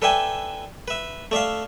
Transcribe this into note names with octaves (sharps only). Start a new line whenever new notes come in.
A4 B4 D5 E5 G5 G#5
B4 E5
A3 D5 E5 F5